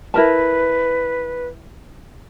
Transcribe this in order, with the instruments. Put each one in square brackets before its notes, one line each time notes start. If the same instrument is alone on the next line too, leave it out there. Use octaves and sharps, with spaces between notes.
[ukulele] E4 A#4 A5 [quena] B4